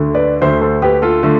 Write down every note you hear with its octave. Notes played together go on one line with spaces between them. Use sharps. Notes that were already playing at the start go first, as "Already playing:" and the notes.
Already playing: D2 D3 A3
B4 D5
D2 D3 A3 C5 E5
A4 C5
G4 B4
F4 A4
D3 A3